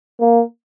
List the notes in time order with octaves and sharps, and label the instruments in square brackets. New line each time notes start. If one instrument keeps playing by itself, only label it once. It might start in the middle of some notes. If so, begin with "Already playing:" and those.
[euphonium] A#3